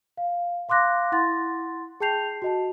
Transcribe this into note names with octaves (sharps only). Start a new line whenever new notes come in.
F5
F5 C6 D6 F#6 A#6
E4 F#5 C6 A6
G#4 G5 A5 G6 C7 F7
F#4 D#5 A5